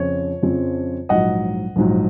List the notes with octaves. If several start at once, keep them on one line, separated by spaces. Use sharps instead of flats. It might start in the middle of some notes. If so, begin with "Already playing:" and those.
Already playing: F2 C#3 F3 C4 C#5
F2 C#3 F3 C4
A#1 G#2 F#3 D#5 F#5
A#1 G#2 F#3